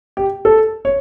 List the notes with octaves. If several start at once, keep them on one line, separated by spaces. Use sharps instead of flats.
G4
A4
C#5